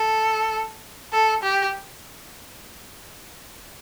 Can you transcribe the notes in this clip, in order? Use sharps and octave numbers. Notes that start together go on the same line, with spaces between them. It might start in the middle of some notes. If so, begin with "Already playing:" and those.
Already playing: A4
A4
G4